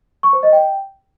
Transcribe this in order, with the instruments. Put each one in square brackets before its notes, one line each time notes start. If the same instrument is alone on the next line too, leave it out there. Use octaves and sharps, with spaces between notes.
[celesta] C#6
C5
D#5
G5